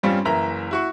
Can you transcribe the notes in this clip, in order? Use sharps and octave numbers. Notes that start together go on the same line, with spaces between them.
G2 G3 C4 C#4 F4
F#1 E3 A#4 E5 A#5
E4 F#4 C#6